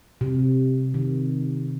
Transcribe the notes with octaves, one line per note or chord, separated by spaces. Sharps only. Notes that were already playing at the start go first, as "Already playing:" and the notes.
C3
D#3